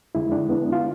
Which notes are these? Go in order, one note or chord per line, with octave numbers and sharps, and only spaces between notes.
F2 D3 G#3 E4
D4
B3
F4